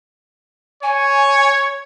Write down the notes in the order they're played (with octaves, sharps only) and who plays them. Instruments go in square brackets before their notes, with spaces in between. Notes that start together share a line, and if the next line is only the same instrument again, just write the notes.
[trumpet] C#5 [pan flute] G#5